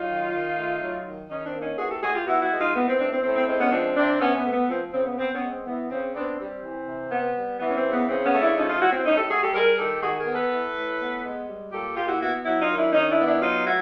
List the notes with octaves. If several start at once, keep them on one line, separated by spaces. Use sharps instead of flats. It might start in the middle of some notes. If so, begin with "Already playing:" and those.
Already playing: F#3 D#4 F4
D#3
D#3
A3
F#3
D#3
D#3 C#4 D#4
C4 D4
A#3
C#4 D#4
E3 F#4 G#4
G4 A4
A2 F#4 G#4
F4 G4
B3 E4 F#4
E4 F#4
G#3
D#4 F4
E3 B3
C4
A2 C4 D4
C4
A2 C4
C4
G#3 C4
B3 C#4
F3 C4 D4
C3 C4 D4
C3 B3 C#4
B3
A3
B3
F3 C4
C#3 C4
B3
B3 C4
B3 C#4
G#3
C4
E3 B3
C#3 C4
B3 C4 D4
G3 C4
E3
C3
B3
G3
E3 B3
C#4
C4
C#3
B3
C#3 C4
B3 C#4
A3
D4 E4
F3 C#4 D#4
D#4 F4
A2 E4 F#4
C4
A2 C#4 D#4
G4 A4
A3 F#4 G#4
G4 A4
G3 G#4 A#4
D#3 G4 A4
D#3 F#4 G#4
G#4 A#4
B3
A4 B4
E3
A2
B3
G#3
G3
A#2 G4 A4
A#2 F4 G4
E4 F#4
B3 E4 F#4
F#3 E4 F#4
D#4 F4
D#3
D4 E4
D#3 C#4 D#4
D4 E4
B3
D4 E4
F#3 D#4 F4
A2 E4 F#4